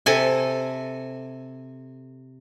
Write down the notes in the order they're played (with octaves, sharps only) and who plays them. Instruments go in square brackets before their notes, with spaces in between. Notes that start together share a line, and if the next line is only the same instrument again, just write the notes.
[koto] C3 A4 G#5